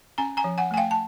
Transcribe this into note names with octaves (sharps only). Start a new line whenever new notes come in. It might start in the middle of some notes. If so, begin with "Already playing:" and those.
C#4 G#5 A#5
G#5 A#5
F3
F#5 G#5
A3 G#5
F5 G5
A5